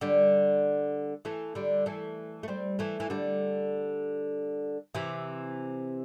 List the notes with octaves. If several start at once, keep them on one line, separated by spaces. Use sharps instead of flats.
D3 G3
E3 A3
D3 G3
E3 A3
A3
G3 C4
E3 A3
E3
D3 G3
C3 E3